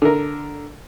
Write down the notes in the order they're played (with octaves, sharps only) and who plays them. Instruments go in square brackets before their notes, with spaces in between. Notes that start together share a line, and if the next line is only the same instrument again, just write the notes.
[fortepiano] D3 A#4